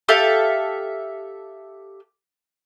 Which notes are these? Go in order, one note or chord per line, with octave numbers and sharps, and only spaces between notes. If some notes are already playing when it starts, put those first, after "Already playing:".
G4 A4 E5 F5